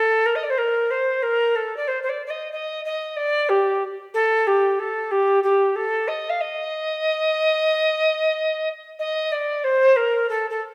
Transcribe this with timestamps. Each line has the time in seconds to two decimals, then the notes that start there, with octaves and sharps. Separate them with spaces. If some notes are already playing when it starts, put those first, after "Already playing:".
Already playing: A4
0.25 A#4
0.35 D#5
0.43 D5
0.50 C5
0.58 A#4
0.90 C5
1.22 A#4
1.55 A4
1.76 D5
1.87 C5
2.03 C5
2.09 D5
2.26 D5
2.30 D#5
2.52 D#5
2.85 D#5
3.16 D5
3.49 G4
4.14 A4
4.47 G4
4.79 A4
5.11 G4
5.43 G4
5.75 A4
6.08 D#5
6.29 F5
6.40 D#5
8.99 D#5
9.32 D5
9.64 C5
9.96 A#4
10.29 A4
10.50 A4